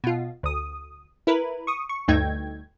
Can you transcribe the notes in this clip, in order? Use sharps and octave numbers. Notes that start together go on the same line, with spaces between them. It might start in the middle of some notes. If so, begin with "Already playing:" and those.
B2 F4
D2 D#6
E4 A#4 B4
C#6 D#6
C#6
D2 G2 A3 D#4 G5 G#6